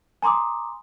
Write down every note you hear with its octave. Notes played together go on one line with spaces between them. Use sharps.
G#5 A#5 C6 D6 D#6